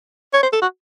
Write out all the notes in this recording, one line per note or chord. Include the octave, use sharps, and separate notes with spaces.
C#5
C5
A4
F#4